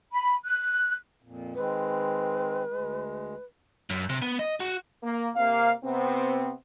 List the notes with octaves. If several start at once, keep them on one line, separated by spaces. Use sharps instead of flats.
B5
F#6
F2 A#2
D#3 G#3 C4 B4
D2 G#3
F#2
C3
B3
D#5
F#4
A#3
C3 A#3 F5
C3 B3 C4